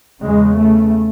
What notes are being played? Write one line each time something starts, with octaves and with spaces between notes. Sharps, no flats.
E2 C#3 G#3
A3